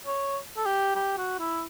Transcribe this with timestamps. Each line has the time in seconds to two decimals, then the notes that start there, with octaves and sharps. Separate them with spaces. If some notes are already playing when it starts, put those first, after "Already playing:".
0.07 C#5
0.57 A4
0.66 G4
0.96 G4
1.18 F#4
1.39 E4